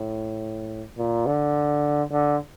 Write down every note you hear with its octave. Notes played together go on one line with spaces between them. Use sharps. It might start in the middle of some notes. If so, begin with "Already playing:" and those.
Already playing: A2
A#2
D3
D3